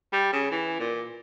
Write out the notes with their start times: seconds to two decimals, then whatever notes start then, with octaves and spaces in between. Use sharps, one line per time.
0.13 G3
0.33 C#3
0.51 E3
0.80 A#2